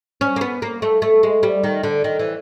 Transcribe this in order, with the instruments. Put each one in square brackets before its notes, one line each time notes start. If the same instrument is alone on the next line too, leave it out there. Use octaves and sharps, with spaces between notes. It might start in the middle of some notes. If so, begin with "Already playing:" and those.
[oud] C#4
A#3
B3
A#3
A3
A3
G#3
G3
D#3
D3
D#3
E3